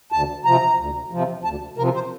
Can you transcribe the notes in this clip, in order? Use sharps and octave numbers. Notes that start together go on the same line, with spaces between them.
D2 A5
C3 F3 A#5
D2
C3 F3
D2 A5
C3 F3 A#4
C5